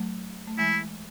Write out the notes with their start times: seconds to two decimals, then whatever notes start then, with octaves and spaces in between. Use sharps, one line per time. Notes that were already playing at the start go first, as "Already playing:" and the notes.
Already playing: F#3 A3
0.47 A3
0.58 E3 G#3 E4